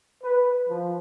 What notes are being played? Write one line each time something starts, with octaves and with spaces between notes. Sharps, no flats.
B4
F3